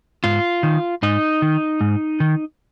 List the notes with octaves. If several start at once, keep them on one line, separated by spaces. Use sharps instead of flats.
G#2 F4
D#3
G#2 D#4
D#3
G#2
D#3